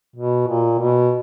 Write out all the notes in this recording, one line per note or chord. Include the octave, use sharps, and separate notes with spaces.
B2
A#2
B2